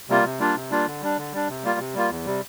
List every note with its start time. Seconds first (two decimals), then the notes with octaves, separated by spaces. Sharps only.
0.09 C3 G3 A#3 F4
0.24 C3
0.39 G3 A#3 D4 F4
0.55 C3
0.70 G3 A#3 D4 F4
0.86 D3
1.02 G3 D4
1.17 D3
1.32 G3 D4
1.49 C3
1.64 G3 A#3 F4
1.79 C3
1.94 G3 A#3 F4
2.10 E2
2.26 C3 G3